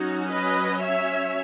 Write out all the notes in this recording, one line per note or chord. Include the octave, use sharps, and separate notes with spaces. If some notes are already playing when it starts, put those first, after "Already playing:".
Already playing: F#3 C#4 D#4 F#4
B4 D#5
C#5 E5